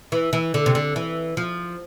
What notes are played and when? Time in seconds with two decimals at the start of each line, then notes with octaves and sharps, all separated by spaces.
0.12 E3
0.33 E3
0.54 D3
0.66 C3
0.75 D3
0.96 E3
1.37 F3